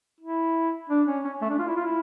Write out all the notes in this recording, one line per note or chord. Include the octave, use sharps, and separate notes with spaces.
E4
D4
C#4
C#4
A3
D4
F4
E4
F4
E4